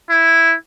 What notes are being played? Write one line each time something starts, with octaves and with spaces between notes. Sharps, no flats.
E4